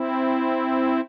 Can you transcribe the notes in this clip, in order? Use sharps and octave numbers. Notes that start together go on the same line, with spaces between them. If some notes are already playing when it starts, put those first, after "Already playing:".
Already playing: C4 E4